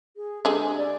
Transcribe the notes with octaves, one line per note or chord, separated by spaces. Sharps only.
G#4
D3 G#3 G4
D5